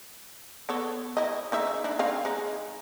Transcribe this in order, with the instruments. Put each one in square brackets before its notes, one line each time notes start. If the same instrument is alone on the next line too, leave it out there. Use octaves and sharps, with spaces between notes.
[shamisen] B3 A4 C#5
E4 D#5
C#3 D#4 E5
D4 E4
C4 C#5 F5
G#3 D#4